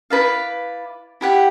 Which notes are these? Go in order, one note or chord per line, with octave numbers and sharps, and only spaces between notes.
E4 B4 D5 F5
E4 G4 F#5